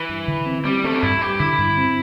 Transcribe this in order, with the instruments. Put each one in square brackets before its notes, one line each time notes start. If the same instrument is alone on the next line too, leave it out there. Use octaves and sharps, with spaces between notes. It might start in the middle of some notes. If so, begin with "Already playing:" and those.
Already playing: [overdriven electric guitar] E3
[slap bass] G2
D3
C4
[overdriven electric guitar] G3 [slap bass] C4
[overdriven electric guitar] A3 [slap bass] C4
[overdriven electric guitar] D4
[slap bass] G2 [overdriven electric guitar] E4
[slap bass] G2 [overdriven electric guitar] G4
[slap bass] D3 [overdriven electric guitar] E4
[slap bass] G2
C4